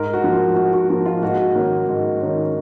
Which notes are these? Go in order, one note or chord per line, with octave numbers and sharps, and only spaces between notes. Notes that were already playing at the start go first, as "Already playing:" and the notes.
Already playing: G#2 A#4
F#4
F3 A#3
G#2 F#4
F#4
F3 A#3 F#4
F4
G#2 F#4
D#3 A#3 C#4
G#2
D#3 A#3 C#4